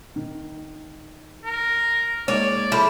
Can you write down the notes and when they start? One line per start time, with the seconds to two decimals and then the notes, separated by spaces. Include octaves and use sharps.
0.16 D#3
1.44 A#4
2.28 G#3 A#3 D#4 C#5 D5
2.72 F3 E4 G#4 A4 C6